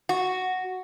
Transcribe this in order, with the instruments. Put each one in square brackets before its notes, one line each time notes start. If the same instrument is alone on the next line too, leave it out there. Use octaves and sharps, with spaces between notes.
[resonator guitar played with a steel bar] F#4